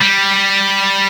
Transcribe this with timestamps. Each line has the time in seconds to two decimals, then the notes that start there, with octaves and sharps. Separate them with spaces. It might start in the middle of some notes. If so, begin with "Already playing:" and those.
0.01 G3